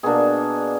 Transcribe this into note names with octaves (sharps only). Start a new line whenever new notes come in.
B2 A#3 D4 G#4